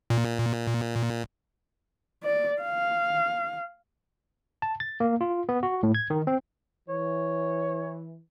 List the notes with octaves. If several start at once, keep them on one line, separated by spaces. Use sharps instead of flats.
A#2
D5
F5
A5
A6
A#3
F4
B3
F#4
A2
G#6
D#3
C4
E3 C#5